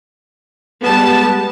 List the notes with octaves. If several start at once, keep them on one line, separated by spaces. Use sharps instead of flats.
G3 G#3 B3 A5